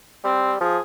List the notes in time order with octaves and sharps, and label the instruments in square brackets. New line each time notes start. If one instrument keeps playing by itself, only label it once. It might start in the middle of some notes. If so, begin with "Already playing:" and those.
[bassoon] G3 [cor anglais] C4
[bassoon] F3 [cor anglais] G#4